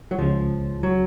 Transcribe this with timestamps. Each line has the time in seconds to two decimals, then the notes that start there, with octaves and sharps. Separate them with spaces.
0.11 F#3
0.19 C#2 C#3 F3 G#3 C#4
0.83 F#3